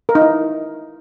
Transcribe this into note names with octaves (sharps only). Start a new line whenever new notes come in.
A#4
D#4
E4